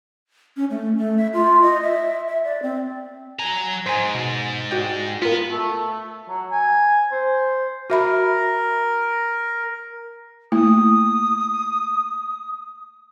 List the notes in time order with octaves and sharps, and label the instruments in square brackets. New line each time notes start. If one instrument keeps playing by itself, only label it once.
[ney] C#4
A3
A3
E5
F4
D#5
E5
E5
D5
C4
[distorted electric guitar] F#3 A#5 [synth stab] G#5
[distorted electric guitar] G#2 [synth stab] C5 G#5
[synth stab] B2
F#4 D5 G5
[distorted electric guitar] B3 [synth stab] F4 A#4
[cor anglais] A3
F#3
G#5
C5
[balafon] F#4 E5 B5 [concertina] A#4
[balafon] A3 A#3 E4 [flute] D#6